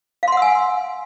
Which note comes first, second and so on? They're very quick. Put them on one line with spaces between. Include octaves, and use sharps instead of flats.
F5 C6 F#5 E6 G#5